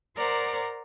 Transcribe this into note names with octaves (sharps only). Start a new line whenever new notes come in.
A#4 C5 D5 F#5 A#5